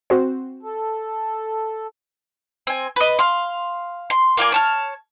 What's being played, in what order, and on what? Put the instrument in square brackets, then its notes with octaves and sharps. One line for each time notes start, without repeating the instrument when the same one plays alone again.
[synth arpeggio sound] C4 F#4 C5
[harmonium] A4
[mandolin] C4 G#5
B4 D#5
F5 C6
C6
A#3 F4 D5 G#5
C#5 A5 F6